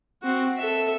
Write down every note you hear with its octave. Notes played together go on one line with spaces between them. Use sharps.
C4 F#4
A4 E5